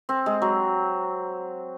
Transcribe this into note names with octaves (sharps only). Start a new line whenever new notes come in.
C4
G#3
F#3